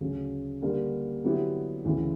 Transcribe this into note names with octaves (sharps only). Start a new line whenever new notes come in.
D2 C#3 F#3
D3 G3 A#3 D4 G4
D3 F#3 B3 E4 G4
D2 C#3 E3